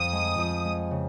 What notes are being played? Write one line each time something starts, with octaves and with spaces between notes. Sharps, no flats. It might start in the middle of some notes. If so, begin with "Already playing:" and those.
Already playing: F2 F3 D#6
G#3
F2
G#3
C#3